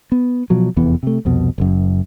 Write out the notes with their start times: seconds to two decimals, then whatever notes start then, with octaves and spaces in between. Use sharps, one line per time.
0.12 B3
0.50 B2 F3 F#3
0.77 F1 E2 E3 B3
1.03 C3 A3
1.25 C2 F2 B2
1.58 F#1 F#2